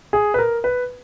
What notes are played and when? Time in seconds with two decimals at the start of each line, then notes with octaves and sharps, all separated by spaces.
0.13 G#4
0.34 B4
0.39 A#4
0.64 B4